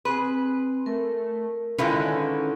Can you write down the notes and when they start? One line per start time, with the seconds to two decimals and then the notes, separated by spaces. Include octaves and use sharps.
0.05 C4 G#4 B4
0.86 A3 A#4
1.78 D3 D#3 G#3 C#4 E4 F4 B4